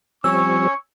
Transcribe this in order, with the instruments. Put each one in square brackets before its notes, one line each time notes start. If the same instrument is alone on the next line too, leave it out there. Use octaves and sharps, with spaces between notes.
[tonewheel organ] F3 G3 C4 [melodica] C#4 C#5 [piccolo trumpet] C#6 [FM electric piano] E6